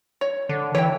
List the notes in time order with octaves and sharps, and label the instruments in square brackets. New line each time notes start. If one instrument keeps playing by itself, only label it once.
[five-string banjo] C#5
[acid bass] D3
[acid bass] E3 [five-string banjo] C#5 G5